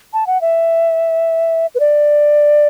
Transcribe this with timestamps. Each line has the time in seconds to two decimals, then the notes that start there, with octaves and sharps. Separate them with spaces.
0.13 A5
0.27 F#5
0.41 E5
1.75 B4
1.80 D5